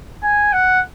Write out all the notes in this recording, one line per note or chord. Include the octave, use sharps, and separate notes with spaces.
G#5
F#5